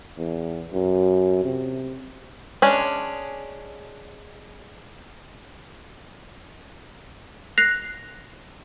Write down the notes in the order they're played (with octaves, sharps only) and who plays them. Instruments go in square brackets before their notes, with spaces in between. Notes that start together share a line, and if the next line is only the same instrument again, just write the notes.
[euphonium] E2
F#2
C3
[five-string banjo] G#3 C#4 D4
[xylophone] F#6 A#6 C7 F7